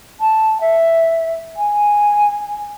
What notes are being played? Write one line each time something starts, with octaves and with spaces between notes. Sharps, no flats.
A5
E5
G#5